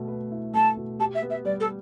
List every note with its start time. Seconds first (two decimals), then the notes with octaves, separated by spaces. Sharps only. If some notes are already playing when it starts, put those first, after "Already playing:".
Already playing: B2 A3
0.08 B4
0.32 E4
0.54 A3 A5
0.77 B2
0.99 G4 A5
1.14 E5
1.22 B3
1.30 E5
1.45 G3 D5
1.60 A4